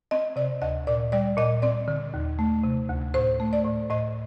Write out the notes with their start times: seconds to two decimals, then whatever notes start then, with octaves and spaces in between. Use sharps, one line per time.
0.11 C4 D#5
0.36 C3 D5
0.62 D2 D#5
0.87 A#2 D5
1.12 G3 D5
1.37 A#2 D#5
1.62 C4 D5
1.88 D3
2.14 D#2
2.39 A3
2.64 C3
2.89 D2
3.14 A2 C5
3.40 A3
3.53 D5
3.65 A2
3.90 A2 D#5